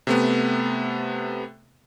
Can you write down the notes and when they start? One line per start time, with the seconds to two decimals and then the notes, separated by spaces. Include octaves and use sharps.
0.07 C3 A3 B3